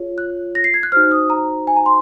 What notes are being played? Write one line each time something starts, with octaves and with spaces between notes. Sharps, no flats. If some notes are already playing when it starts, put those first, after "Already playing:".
Already playing: F4 G#4 C#5
F#6
A#6
C7
G#6
F#6
D#4 F#4 C5 F6
D#6
A#5
G#5
A#5
C6